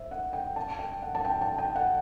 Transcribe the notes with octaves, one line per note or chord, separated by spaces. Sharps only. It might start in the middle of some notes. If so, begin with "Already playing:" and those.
Already playing: C5 E5
F#5
G5
A5
G5
F#5
A5
G5
A5
G5
F#5